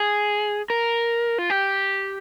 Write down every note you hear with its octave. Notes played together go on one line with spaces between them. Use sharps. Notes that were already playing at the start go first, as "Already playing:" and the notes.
Already playing: G#4
A#4
F4
G4